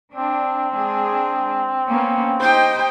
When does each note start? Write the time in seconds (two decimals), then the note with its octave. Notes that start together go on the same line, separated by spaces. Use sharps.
0.14 C4 D4
0.73 G#3 D4 G#4
1.88 A#3 B3 C#4
2.40 D#4 G4 C5 D#5 G5